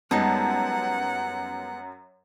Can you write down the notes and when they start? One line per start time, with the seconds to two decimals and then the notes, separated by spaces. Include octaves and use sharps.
0.11 F#2 G3 G#3 B3 D#4 F#5 A5